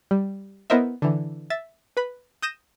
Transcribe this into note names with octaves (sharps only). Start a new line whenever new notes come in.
G3
B3 E4 A#4 C5 D#5 E5
D3 E3
E5 A6
B4 B5
D#6 G6 A#6 D#7 E7